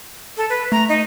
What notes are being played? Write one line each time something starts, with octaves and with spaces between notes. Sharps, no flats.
A4
B4
A3 A#5
D#4